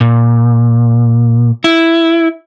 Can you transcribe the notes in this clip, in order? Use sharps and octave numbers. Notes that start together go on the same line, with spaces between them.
A#2
E4